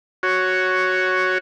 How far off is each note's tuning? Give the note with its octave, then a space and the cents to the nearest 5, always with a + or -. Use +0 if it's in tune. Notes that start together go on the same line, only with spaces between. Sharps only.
F#4 +5 C#5 +0